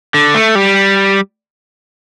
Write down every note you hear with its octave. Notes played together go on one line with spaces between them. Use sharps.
D3
A3
G3